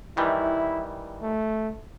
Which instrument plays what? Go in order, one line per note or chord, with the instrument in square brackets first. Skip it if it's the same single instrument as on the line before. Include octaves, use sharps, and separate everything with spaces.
[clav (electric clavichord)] D#3 E3 G3 [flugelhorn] E4
[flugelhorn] A3